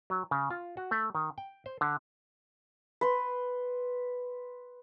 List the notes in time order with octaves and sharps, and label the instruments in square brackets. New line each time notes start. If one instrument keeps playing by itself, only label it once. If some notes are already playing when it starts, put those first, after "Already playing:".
[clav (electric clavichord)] F#3
C#3
F4
F#4
A3
D#3
G5
C5
D3
[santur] B4 C6